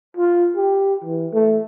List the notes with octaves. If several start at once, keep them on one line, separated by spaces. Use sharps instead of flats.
F4
G4
E3
A3